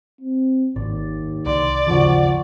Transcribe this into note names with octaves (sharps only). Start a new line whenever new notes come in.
C4
G#1 D#2 D5
C2 D5 C6
G#1 D#2 C#3 F3 A3 F#4